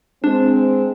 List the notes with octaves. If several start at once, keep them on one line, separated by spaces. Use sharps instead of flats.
G#3 C4 D4